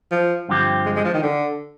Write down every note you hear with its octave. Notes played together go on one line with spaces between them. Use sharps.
F3
G2 D3 F3 C4 G4
G#3
G#3
F3
D#3
D3